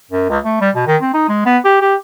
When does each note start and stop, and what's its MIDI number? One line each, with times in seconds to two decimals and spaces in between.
0.11 0.26 42
0.29 0.39 37
0.44 0.56 57
0.61 0.70 55
0.75 0.85 47
0.87 0.96 51
1.01 1.13 60
1.14 1.27 63
1.28 1.43 56
1.45 1.58 59
1.64 1.76 67
1.81 1.95 67